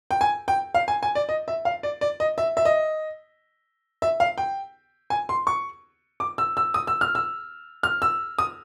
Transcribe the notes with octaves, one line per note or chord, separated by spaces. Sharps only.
G5
G#5
G5
F5
G#5
G#5
D5
D#5
E5
F5
D5
D5
D#5
E5
E5
D#5
E5
F5
G5
G#5
C6
C#6
D6
E6
E6
D#6
E6
F6
E6
F6
E6
D#6